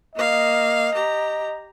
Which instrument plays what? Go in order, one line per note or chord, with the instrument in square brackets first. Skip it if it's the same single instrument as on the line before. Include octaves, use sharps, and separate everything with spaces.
[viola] A#3 F5 [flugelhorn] D#5
[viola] G4 A#5